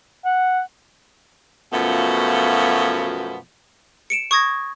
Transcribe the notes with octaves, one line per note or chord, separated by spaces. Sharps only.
F#5
F#2 B2 F3 A3 B3 F4
C#7 D7 E7
C#6 D#6 G#6 A#6